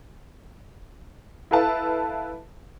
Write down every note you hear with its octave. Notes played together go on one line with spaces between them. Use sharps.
E4 A4 B4 F5 A5